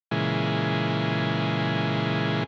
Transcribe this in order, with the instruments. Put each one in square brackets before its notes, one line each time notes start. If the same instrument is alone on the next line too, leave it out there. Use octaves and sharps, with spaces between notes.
[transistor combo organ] A#2 C#3 E3 G#3